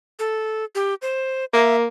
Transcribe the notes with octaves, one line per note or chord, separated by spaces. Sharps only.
A4
G4
C5
A#3 E5